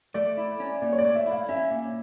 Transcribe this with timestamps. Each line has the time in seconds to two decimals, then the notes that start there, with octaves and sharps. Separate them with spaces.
0.14 A3 D5
0.37 E4
0.60 C#4
0.82 A#2 D5
0.93 C#5
0.98 D5
1.04 A3
1.15 E5
1.26 E4
1.31 F5
1.49 C#4 E5
1.71 A#2